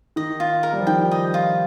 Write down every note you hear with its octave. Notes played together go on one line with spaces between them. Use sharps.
D#3 D#5
F4
A#4
G3
F3
D#3 G5
D#5
F4